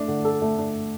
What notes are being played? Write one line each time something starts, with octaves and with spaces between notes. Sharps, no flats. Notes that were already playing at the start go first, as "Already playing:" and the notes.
Already playing: A3 D4
D3
A4
A3
D4